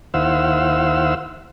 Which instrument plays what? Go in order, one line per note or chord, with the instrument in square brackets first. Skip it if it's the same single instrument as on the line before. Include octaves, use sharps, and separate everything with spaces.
[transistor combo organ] D#2 E4 C5 F5 F#5 E6